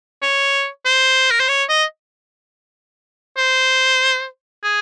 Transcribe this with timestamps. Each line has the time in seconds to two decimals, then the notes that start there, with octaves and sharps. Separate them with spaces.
0.22 C#5
0.85 C5
1.31 A#4
1.40 C5
1.49 C#5
1.69 D#5
3.37 C5
4.64 G#4